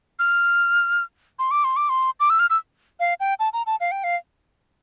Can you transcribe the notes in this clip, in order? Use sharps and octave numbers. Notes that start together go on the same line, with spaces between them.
F6
C6
D6
C6
D6
C6
D6
E6
F6
E6
F5
G5
A5
A#5
A5
F5
G5
F5